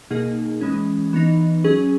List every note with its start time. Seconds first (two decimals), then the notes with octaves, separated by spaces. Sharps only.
0.10 B2 A#3 D#4 G#4
0.61 E3 G#3 C#4
1.13 E3 B3 D#4
1.64 F#3 C#4 G#4